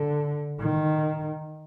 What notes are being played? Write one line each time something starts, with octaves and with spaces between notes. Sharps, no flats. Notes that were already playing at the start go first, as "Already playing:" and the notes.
Already playing: D3
D#3